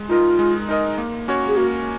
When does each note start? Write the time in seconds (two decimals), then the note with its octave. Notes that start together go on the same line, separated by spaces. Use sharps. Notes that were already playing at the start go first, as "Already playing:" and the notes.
Already playing: G#3
0.09 D#4 F4 A#4 D#5
0.39 G#3
0.69 D#4 A#4 D#5
0.98 A#3
1.28 C#4 F#4 C#5
1.47 G#4
1.57 A#3 F#4